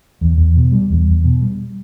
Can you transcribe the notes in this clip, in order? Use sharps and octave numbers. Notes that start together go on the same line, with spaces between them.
E2
E2
B2
G3
E2
E2
B2
G3